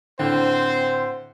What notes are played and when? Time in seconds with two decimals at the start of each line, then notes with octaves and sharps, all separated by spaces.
0.19 A2 D3 C4 C5